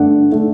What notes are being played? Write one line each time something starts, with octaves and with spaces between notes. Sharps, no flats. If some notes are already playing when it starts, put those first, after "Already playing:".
Already playing: G2 D3 A3 D5 F#5
D3 A3